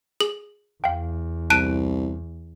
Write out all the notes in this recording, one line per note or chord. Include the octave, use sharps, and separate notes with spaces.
G#4 F#7
E2 F5 G5
C2 A5 F#6 D7 D#7